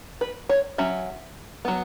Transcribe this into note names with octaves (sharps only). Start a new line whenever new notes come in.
B4
C#5
F#3 C#4 E5
F#3 B3